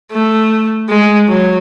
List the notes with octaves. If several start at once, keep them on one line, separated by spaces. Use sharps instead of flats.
A3
G#3
F#3